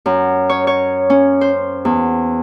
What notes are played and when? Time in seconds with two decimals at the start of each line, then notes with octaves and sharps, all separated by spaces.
0.06 F#2
0.49 C#5
0.67 C#5
1.10 C#4
1.41 C5
1.85 E2